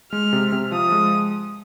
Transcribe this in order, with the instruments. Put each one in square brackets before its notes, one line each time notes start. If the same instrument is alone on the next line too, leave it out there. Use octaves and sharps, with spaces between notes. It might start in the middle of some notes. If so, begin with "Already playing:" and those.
[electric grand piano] G#3 [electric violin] F6
[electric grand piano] C3
C3
[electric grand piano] F3 [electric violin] D#6
[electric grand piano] G#3